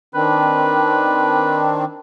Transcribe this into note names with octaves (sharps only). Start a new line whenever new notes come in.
D#3 C4 D4 B4